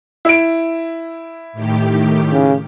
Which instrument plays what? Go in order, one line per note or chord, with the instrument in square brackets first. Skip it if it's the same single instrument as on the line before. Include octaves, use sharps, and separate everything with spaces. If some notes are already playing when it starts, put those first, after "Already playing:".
[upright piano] E4 D7
[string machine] A2 D#3 G4
[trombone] C#3